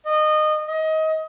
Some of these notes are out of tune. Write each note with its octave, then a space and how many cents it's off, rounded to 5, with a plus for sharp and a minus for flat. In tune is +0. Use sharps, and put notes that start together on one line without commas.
D#5 -20
D#5 +25